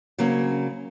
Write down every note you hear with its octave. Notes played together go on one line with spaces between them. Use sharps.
C#3 F#3 A#3 C4 C#4